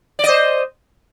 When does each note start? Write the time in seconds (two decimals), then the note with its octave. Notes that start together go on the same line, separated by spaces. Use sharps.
0.19 D5
0.24 D#5
0.29 C5